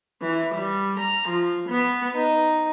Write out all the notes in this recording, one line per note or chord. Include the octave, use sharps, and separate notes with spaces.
E3
G3
A#5
F3
B3
D#4